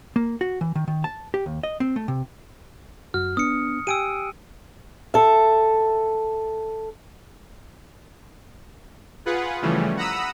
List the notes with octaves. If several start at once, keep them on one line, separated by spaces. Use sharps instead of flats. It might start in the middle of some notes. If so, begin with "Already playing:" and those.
A#3
F#4
E3
D#3
D#3
A5
G4
D#2
D#5
C4
A3
C3
F#2 F#4 F6
B3 D4 D#6 C#7
G4 G5 G#5 E6 D7 D#7
A4 E5
F4 G#4 B4 F#5
C#3 E3 F3 G3 A3 C#4
F#5 A#5 B5 D#6 E6